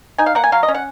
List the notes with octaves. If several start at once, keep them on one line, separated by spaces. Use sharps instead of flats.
D#4 G#5
F5
A#3 F#5
G#5
F#3 F5
D#5
C#4
F#5